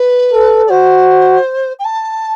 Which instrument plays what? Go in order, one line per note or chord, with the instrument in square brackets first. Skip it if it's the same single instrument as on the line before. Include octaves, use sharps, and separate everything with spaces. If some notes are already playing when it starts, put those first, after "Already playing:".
Already playing: [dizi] B4
[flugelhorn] A4
[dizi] D5
[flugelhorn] F#4 [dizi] C5
[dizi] G5
A5